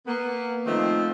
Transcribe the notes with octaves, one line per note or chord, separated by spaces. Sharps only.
A#3 B3
D#3 F3 A3 C4 D#4 F4